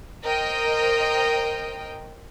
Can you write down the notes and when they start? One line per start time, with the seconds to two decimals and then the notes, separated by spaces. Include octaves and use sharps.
0.24 A#4 C5 D#5 G5